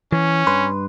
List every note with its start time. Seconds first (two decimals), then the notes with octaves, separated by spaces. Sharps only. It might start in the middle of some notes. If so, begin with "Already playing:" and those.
0.12 E3 C#4
0.47 G2 B4 C6